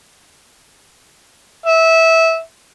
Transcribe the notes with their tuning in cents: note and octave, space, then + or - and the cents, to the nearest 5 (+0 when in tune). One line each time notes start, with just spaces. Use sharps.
E5 -15